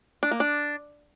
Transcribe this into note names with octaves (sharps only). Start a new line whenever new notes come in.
D4
A#3
D4